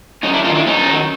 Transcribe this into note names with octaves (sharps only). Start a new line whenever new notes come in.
F#2 C#4 D#4
D4 E4
D#3 F#3 D#4 F4
D4 E4
F#2 C#4 D#4
D#3 F#3